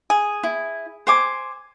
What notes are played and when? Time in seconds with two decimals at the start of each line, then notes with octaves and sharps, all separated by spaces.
0.10 G#4
0.43 E4
1.07 C5 G#5 D6